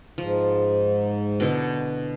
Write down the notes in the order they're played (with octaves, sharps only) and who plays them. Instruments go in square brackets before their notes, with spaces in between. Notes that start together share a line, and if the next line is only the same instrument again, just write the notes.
[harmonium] G#2 [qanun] F3
[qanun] B2 D3 E4